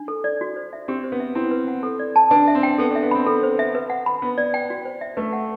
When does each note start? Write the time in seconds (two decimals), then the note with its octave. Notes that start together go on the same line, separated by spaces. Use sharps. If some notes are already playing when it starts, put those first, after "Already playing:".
Already playing: D4
0.08 A4
0.24 D5
0.41 F#4
0.56 C5
0.73 E5
0.88 C4 G4
1.04 C5
1.12 B3
1.20 E5
1.35 C4 E4
1.51 B4
1.68 F#5
1.83 A4
1.99 D5
2.16 A5
2.31 D4 B4
2.48 E5
2.55 C4
2.63 G5
2.78 B3 A4
2.91 D4
2.95 E5
3.03 B3
3.11 C4 B5
3.27 C4 A4
3.43 C5
3.59 E5
3.75 B4
3.90 F#5
4.06 B5
4.22 B3 B4
4.38 D5
4.54 G5
4.70 F#4
4.85 C5
5.01 E5
5.17 A3 B4
5.33 F#5